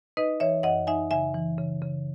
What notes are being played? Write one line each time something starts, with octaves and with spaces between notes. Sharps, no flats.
D#4 B4 D#5
E3 C#5 E5
F#2 D#5 F#5
D#4 E5 G#5
C#3 E5 G#5
E3
C#3
C#3